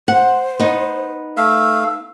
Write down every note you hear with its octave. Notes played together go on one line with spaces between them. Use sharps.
C5 F#5
B3 D#4
A3 F5 E6